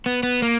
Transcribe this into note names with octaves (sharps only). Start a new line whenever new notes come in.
B3
B3
A#3